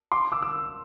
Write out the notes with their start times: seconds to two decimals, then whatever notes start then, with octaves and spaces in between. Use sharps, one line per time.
0.12 C6 D6
0.32 D6 E6
0.42 D6 E6